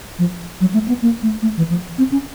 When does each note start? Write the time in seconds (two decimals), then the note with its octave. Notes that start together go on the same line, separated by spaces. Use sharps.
0.19 F3
0.61 F#3
0.74 A3
0.88 B3
1.02 A#3
1.22 A3
1.42 A3
1.57 E3
1.70 F3
1.98 C4
2.12 C#4